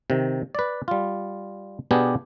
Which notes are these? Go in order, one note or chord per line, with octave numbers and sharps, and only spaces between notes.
C3 D#3
B4 D5
G3 F4
B2 B3 D4 G4 G#4